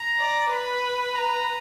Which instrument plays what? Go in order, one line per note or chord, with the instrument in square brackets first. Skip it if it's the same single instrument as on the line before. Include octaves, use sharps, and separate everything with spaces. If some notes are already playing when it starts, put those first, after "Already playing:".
Already playing: [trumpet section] A#5
[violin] D5
[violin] B4 [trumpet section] B5
[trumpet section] A#5